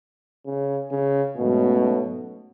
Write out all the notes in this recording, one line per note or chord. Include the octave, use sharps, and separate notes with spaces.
C#3
C#3
G#2 B2 F#3 A3 C#4